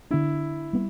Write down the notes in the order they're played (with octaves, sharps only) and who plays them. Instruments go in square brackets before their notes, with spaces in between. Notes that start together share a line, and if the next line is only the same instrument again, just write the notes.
[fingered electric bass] D3 B3 D4 [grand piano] E4
[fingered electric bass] G3 B3